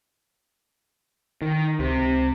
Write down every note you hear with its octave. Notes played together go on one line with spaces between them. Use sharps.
D#3
C#2 C3